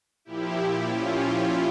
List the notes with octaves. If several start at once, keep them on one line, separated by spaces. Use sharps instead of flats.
A#2 F3 E4 G4
C#4 F4